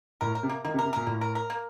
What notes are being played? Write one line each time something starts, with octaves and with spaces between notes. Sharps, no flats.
A2 A#4
A#4
C3
A#3
D#3 A#3
C3
A#4
C3
A#2 A#4
A2 A#3
A#4
A#4
A#3